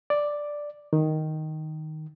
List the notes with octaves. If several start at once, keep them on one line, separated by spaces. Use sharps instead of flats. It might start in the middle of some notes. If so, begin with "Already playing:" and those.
D5
D#3